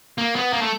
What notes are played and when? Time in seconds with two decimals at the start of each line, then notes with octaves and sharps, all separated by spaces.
0.18 A#3
0.35 B3
0.53 A#3
0.61 A3